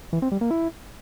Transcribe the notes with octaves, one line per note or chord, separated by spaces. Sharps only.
E3
C4
G3
A#3
E4